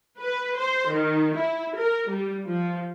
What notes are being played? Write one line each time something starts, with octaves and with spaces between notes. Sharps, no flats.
B4
C5
D#3
E4
A#4
G3
F3